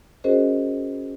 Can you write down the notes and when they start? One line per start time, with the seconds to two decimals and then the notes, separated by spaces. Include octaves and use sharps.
0.24 C#4 F#4 G#4 A#4 C5 D#5